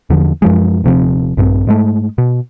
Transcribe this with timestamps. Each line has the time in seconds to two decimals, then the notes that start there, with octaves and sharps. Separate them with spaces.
0.10 E2 D3 F3
0.42 F#2 F3 G#3
0.84 D#1 C3 F3 C4
1.37 A#1 G2 C4
1.67 G#2 G#3 A3
2.18 B2